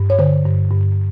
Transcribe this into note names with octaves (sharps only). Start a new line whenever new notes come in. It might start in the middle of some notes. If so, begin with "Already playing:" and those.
Already playing: G2
C#5
D3 C5
G2
G2